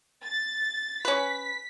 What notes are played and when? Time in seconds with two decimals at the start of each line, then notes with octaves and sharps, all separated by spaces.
0.24 A6
1.05 C#4 B4 B6